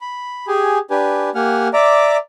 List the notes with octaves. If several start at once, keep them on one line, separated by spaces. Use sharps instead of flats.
B5
G4 G#4 G#5
D4 G4 B4 G#5
A#3 G4 F#5 G#5 F6
D5 E5 A#5 D6